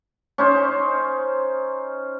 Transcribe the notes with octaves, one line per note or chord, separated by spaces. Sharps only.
C#4 D#4 C5